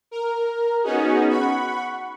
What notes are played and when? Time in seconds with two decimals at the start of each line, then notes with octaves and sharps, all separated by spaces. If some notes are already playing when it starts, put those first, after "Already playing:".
0.11 A#4
0.83 B3 C#4 D#4 F#4 G#4
1.28 F#5 B5 C#6